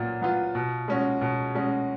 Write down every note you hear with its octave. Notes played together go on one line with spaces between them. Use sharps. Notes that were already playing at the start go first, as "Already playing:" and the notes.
Already playing: A#2 F#3 B3 F4
F#3 B3 F4
B2
G#3 C#4 F#4
B2
G#3 C#4 F#4